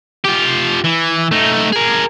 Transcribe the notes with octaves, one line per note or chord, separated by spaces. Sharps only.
F4 G4
E3
A3 D#4
G#4 A#4